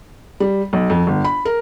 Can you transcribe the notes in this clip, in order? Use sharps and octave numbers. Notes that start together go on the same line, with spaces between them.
G3
B1
F2
G1
B5
A#4